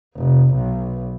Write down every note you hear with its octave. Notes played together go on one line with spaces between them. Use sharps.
F1
B1